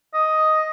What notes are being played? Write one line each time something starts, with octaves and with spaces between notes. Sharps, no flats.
D#5